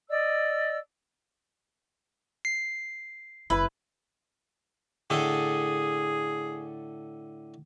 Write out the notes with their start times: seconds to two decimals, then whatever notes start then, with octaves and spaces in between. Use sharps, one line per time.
0.09 D5 D#5 E6
2.45 C7
3.50 F#1 E4 B4 B5
5.10 A2 D3 G#4 A4